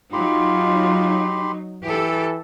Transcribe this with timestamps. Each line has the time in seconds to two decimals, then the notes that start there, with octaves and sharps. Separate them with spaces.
0.13 F#3 D#4 F4 G4 B5 C6
1.84 E3 G4 A4